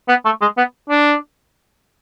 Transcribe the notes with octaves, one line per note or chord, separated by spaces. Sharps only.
B3
A3
G#3
B3
D4